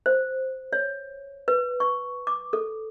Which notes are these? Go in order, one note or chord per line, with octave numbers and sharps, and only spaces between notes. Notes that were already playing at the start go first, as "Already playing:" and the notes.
C5
C#5
B4
C#6
D6
A4